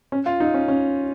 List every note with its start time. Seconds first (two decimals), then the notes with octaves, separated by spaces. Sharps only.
0.12 C#4
0.26 F4
0.40 D#4
0.54 C#4
0.68 C#4